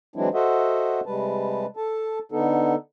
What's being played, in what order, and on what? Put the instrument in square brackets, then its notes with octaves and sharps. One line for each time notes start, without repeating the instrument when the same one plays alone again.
[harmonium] E3 F#3 G#3 C4 D4 E4
F#4 A4 C5 D#5 E5 F#5
C3 G3 G#3 B4 A5
A4 A5
D3 B3 D#4 A4